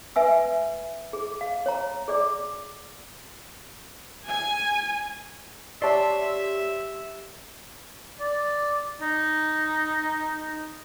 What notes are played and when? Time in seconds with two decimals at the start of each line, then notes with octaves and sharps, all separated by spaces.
0.16 B4 E5 G#5 E6
1.13 G#4
1.41 F5
1.66 C#5 A#5
2.08 G#4 D5 D6
4.29 G#5
5.82 G4 C#5 D5 E5 A5 C6
8.20 D5
9.02 D#4